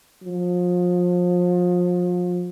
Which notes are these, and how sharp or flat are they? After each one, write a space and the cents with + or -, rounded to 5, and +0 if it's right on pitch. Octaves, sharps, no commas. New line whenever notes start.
F3 +30